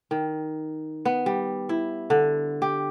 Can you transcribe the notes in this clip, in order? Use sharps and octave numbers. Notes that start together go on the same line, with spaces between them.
D#3
B3
G3
E4
D3
G4